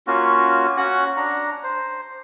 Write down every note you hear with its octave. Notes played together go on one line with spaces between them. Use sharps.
A#3 C#4 F4 F#4
C#4 F#4 F#5
D4 A#5
C5